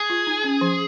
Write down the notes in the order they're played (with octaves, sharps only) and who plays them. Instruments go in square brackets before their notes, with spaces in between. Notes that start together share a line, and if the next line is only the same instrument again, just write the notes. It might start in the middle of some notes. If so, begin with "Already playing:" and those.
Already playing: [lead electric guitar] G#4
[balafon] F4
D#4
C#4
F3